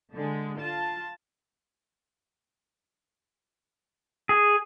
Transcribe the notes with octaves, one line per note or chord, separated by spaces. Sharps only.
D3 G#3
F4 A5
G#4